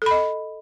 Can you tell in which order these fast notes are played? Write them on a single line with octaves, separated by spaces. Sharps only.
A4 B5 D#5